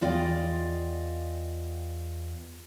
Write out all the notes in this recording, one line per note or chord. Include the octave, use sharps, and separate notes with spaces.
E2 F4 D5 D#5 F5 G5